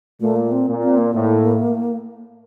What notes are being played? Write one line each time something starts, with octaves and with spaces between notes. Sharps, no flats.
A#2 A3
A#3
C4
A#2
C4
A#3
A2